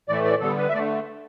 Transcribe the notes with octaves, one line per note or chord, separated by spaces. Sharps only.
A2 E3 A3 D5
D5
D3 G3 B3 A4
B4
E5
D3 A3 D5